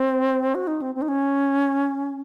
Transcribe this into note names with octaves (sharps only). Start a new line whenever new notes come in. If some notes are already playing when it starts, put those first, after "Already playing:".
Already playing: C4
F#4
D#4
C4
C4
D#4
C#4